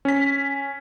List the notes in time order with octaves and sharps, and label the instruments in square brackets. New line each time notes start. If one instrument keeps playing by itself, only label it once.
[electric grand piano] C#4 B6